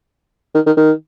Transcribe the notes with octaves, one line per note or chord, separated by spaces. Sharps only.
D#3
D#3
D#3